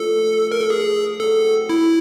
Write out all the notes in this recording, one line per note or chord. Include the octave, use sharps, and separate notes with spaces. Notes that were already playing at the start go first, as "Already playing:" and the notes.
Already playing: A#2 F3 A3 D4 A4
A#4
A4
G#4
A2 F#3 A3 C4 A4
E4